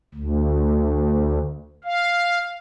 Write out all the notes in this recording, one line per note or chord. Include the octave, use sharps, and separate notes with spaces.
D2
F5